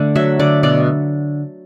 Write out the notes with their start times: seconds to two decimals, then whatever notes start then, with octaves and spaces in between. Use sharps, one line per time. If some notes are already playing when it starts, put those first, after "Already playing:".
Already playing: D3 A3 D5
0.15 F#3 E5
0.40 D3 D5
0.63 B2 D5